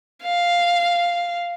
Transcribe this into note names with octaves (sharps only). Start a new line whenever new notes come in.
F5